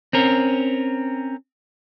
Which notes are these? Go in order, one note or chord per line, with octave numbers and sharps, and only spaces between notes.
C4 C#4 A#4